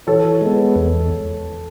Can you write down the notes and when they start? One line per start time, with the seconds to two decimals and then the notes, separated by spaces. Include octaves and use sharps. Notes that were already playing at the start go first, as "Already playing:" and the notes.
0.07 E3 A4 C#5
0.41 G#3 B3
0.76 E2